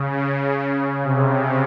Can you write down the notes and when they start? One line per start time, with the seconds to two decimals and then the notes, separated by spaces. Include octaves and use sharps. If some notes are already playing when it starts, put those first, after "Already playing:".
Already playing: C#3
0.12 C#3
1.04 C3